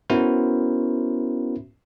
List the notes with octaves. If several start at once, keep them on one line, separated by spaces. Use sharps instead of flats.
B3 C#4 E4 F#4 A#4 C5